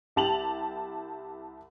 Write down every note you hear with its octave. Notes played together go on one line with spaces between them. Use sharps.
C2 G4 A5 F7 F#7